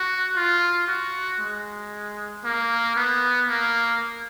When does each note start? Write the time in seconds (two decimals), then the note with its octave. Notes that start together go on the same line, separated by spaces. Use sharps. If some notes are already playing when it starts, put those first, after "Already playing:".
Already playing: F#4
0.36 F4
0.88 F#4
1.40 G#3
2.44 A#3
2.96 B3
3.49 A#3